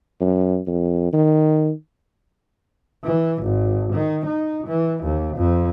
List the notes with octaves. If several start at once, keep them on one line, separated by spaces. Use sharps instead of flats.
F#2
F2
D#3
E3
G#1
D#3
D#4
E3
D#2
F2